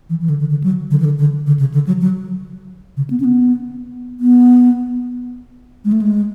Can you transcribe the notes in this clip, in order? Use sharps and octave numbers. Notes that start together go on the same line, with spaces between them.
E3
E3
D3
D3
D3
F#3
D3
E3
D3
D3
D3
C#3
D3
F#3
F#3
C#3
B3
C#4
B3
B3
G#3
A3
G#3